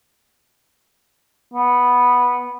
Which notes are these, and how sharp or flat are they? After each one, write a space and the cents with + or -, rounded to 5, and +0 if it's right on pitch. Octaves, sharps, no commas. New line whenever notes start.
B3 -5